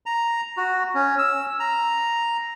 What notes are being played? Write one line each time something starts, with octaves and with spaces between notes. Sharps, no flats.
A#5
F#4
C#4
E6
A#5